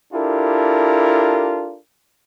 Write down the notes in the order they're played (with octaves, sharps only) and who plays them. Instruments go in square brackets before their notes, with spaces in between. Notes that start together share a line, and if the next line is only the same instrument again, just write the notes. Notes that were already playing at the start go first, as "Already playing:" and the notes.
[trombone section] D4 E4 F4 G4 A4 A#4